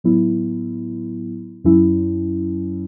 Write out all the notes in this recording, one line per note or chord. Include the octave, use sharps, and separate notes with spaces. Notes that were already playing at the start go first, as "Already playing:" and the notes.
A2 F#3 B3 E4
F#2 F#3 C#4 E4